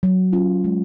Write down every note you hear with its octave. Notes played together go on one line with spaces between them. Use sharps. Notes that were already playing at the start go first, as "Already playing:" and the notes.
F#3
C#4 F4
G#3